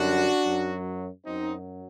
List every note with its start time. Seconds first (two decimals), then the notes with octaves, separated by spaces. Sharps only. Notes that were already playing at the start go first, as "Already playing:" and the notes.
Already playing: F#2 D3 G3 D4 F#4
0.44 F#2 F#3
1.25 F#2 F#3 C4 D#4